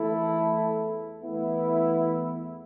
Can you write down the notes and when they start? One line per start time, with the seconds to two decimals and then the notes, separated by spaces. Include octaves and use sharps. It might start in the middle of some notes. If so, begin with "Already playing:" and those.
Already playing: E2 E3 A3 E4 A4
1.23 E2 E3 A3 B3 E4